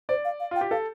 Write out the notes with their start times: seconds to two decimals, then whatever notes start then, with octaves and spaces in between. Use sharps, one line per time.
0.09 C5 D5
0.25 F5
0.40 F5
0.51 F4 G5
0.61 G4
0.71 A4 F5